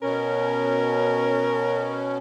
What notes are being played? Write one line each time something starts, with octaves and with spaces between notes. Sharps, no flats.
B2 C#4 A#4